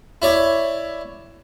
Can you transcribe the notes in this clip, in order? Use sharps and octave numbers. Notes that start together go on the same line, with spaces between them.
E4 C#5 D5